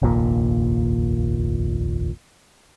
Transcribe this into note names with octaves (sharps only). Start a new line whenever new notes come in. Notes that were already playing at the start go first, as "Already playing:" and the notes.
F1 A#1 D#2 A#2